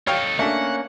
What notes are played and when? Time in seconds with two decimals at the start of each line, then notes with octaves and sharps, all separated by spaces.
0.07 D#4 A4 C#5 F5 G5
0.39 A3 A#3 C#4 D4 F#5